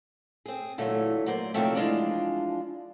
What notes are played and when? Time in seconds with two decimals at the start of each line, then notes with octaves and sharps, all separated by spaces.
0.46 C4 G#4
0.78 A#2 D3 E3 F#3 A3
1.26 F#3 A#3 C5 D5
1.54 C3 D#3 F3 F#3 A3 C4
1.75 E3 F3 G#3 D4 F4 D5